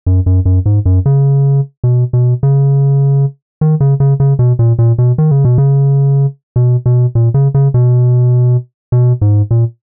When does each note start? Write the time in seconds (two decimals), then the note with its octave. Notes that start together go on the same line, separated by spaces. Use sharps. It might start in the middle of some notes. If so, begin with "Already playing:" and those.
0.06 F#2
0.26 F#2
0.45 F#2
0.66 G#2
0.85 F#2
1.06 C#3
1.84 B2
2.13 B2
2.43 C#3
3.61 D#3
3.80 C#3
4.00 C#3
4.20 C#3
4.39 B2
4.59 A#2
4.79 A#2
4.98 B2
5.18 D#3
5.31 C#3
5.45 B2
5.58 C#3
6.56 B2
6.86 B2
7.15 A#2
7.34 C#3
7.54 C#3
7.74 B2
8.92 B2
9.21 G#2
9.51 A#2